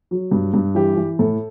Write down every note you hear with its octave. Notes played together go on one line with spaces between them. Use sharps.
F#3
G2
G2
E3 G4
E3
A2 A4